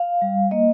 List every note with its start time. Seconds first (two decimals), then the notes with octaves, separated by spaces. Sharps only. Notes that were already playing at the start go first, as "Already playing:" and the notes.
Already playing: F5
0.22 G3
0.51 A#3 D#5